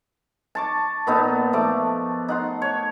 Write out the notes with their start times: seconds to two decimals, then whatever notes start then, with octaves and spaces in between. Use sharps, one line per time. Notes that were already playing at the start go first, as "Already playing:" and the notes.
0.55 A5 C#6 D6
1.07 A#2 B3 D#4 A4
1.53 F3 A3 D6
2.28 D#4 F#5 C6
2.62 C#5